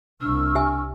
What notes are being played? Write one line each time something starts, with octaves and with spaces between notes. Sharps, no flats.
C2 D4 C#6 E6 F6
G4 E5 G#5